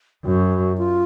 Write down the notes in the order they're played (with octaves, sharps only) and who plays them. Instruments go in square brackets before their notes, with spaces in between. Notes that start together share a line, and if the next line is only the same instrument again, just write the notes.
[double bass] F#2 [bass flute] F#4
[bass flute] F4